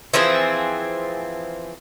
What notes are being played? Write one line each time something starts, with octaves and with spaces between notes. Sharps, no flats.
E3 F3 C4 G#4